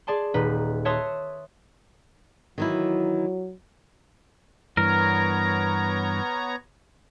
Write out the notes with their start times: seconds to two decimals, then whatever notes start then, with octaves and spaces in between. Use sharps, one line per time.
0.07 G#4 D5 A5 C6
0.34 D#1 D#4 B4
0.85 C#5 E5 A5 C6 D#6 F#6
2.58 D#3 E3 F#3 E4
4.77 G2 E3 B3 A#4 C#5 A#5